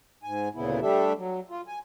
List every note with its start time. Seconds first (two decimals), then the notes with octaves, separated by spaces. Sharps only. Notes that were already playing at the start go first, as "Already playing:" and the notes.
0.23 G#2 G#5
0.55 D2 A#2 C#3 B3 E4
0.81 G3 A3 D4 G4 A4 E5
1.17 F#3
1.49 F4
1.67 G#5